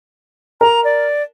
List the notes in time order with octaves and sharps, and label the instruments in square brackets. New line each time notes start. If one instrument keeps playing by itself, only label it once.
[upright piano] A#4 [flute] A#5
[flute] D5